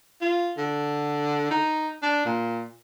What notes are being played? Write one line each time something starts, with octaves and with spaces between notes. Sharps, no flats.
F4
D3
D#4
D4
A#2